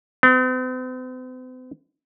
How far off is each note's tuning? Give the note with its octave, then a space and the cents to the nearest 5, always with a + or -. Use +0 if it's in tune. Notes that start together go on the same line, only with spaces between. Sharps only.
C4 -45